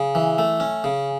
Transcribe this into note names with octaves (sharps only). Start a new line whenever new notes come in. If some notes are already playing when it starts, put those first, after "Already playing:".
Already playing: C#3
E3
A3
C#4
C#3